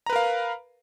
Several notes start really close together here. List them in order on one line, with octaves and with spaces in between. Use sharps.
A#5 B4 A#4 F5